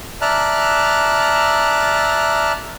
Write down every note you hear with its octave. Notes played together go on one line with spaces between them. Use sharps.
D5 E5 A5 A#5 F6 F#6